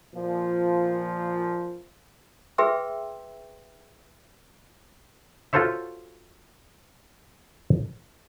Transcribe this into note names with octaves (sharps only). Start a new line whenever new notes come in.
A#2 F3
G#4 B4 E5 G5 C6 E6
F4 F#4 A4 C5 C#5 E5